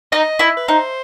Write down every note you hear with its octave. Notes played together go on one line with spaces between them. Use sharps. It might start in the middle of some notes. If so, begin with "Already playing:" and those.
D#4 D#5
E4
B4
D#4 C5